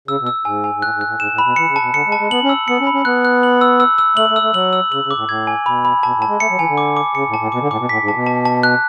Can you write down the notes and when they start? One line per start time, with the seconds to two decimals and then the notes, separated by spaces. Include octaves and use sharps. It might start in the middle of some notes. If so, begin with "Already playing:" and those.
0.08 C#3 E6
0.20 B2
0.27 E6
0.45 G#2 G#5
0.64 G#5
0.75 G#2
0.82 A2 F#6
0.94 G#2
1.01 F#6
1.07 A2
1.19 G#2 E7
1.32 A2
1.38 B5
1.45 B2
1.56 E3 C#7
1.68 C#3
1.76 A5
1.81 B2
1.93 D3 C#7
2.07 G#3
2.12 A5
2.19 G#3
2.31 B3 F#7
2.44 C#4
2.49 E6
2.68 B3 C#7
2.81 C#4
2.87 B5
2.93 C#4
3.05 B3 F#6
3.25 F#6
3.43 F#7
3.61 E6
3.80 E6
3.98 E6
4.17 A3 F#7
4.30 A3
4.36 E6
4.42 A3
4.54 F#3 F#7
4.73 E6
4.92 C#3 F#7
5.04 C#3
5.11 D6
5.16 A2
5.29 A2 G#6
5.47 G#5
5.66 B2 B5
5.85 B5
6.03 B2 A5
6.16 A2
6.22 A5
6.28 G#3
6.40 A3 C#7
6.50 F#3
6.58 E3 G#5
6.69 D3
6.78 D6
6.97 D6
7.15 C#3 C#7
7.28 A2
7.34 A5
7.39 A2
7.52 B2 D6
7.61 D3
7.71 A2 D6
7.80 B2
7.89 A2 B6
8.02 G#2
8.08 A2 A5
8.14 B2
8.26 A5
8.45 A5
8.63 F#6